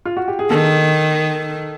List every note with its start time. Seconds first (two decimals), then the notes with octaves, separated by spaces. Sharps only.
0.05 F4
0.17 F#4
0.28 G4
0.39 G#4
0.50 D#3 A4